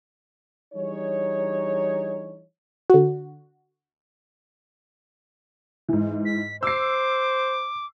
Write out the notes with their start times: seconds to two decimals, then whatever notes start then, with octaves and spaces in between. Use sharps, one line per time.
0.74 E3 G3 D4 D#4 G#4 C#5
2.90 D3 F#4
5.89 G#2 E3
6.25 B6
6.63 C5 D6 E6 C7